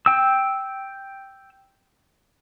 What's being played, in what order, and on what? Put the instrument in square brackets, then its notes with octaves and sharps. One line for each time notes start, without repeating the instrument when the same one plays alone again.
[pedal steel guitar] G5 E6